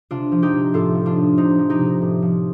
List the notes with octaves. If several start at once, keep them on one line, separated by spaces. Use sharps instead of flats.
C3 D4 F4
F3
D#4 G4
C3
A2 F4 A4
F3
D4 F4
A2
C3 C4 D#4
F3
D#4 G4
C3
A2
F3